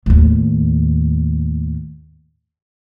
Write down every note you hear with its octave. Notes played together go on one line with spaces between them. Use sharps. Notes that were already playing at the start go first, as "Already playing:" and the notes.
D#2 A2